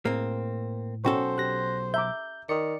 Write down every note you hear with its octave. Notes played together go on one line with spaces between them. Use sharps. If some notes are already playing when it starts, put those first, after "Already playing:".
A2 A#3 C4 G#4
B1 C#4 F#4 A4 C5 G5 C#6
G4 F#6 A#6
E5 A#5 D6 G6
D#3 D5 C#7